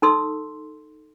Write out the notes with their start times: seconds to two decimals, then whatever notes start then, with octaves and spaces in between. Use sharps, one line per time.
0.02 D#4 A4 C6 E6